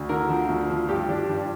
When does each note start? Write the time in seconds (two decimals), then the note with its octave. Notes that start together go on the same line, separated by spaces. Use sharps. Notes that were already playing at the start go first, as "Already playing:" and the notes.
Already playing: D2
0.09 D3 A#4
0.29 F3
0.49 D2
0.70 F3
0.88 G2 G4
1.09 F3 D4
1.29 G2